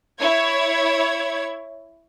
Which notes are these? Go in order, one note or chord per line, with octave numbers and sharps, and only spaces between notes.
E4 C#5 G#6